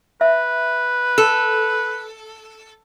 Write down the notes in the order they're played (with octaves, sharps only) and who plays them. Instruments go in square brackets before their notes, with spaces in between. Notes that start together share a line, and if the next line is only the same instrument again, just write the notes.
[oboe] B4 [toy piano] E5
[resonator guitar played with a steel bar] A4